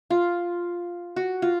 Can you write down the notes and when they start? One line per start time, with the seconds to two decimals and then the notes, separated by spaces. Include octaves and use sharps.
0.10 F4
1.16 F#4
1.42 F4